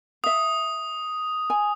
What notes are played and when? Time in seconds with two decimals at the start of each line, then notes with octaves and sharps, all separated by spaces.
0.24 E5 F5 D#6
1.50 G#5